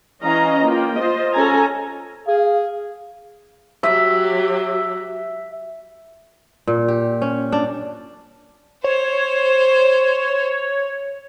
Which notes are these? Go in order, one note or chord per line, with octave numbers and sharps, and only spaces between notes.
E3 C#4 D#5 F5 A#5
A#3 F4 G5
F4 C5 D#5
C#4 A4 G#5 A#5
G#4 F5
F#3 G4 E5
A#2
G4
C#4
D4
C5 C#5